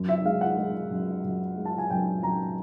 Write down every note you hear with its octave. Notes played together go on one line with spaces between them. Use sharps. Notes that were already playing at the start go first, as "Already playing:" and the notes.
Already playing: F#2
E5
G#3 F5
F#5
G#3
F#2
F#2
G#3
A5
G#5
F#2 G5
F#2 A#5